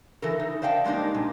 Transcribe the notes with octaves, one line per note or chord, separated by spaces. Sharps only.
E3 A4 A#4
D#4
C5 D5 F5 G5 A5
G3 G#3 A#3 D4 D#4
A#2